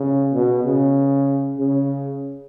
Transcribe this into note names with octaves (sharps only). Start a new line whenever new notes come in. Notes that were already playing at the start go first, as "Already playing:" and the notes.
Already playing: C#3
B2
C#3
C#3